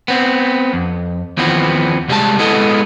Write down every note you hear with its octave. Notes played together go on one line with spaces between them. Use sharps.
B3 C4
F2
D#2 E3 F3 B3 C4
C2 G3 G#3 A5
G#3 B3 E4 A4 D#5